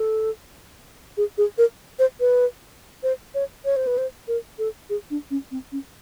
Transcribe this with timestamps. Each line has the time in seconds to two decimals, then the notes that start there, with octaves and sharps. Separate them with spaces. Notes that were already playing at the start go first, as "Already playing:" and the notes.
Already playing: A4
1.17 G#4
1.38 G#4
1.58 A#4
1.99 C5
2.20 B4
3.03 C5
3.35 C#5
3.65 C#5
3.76 C5
3.87 B4
3.98 C5
4.28 A#4
4.59 A4
4.90 G#4
5.10 D4
5.31 C#4
5.51 C4
5.72 C#4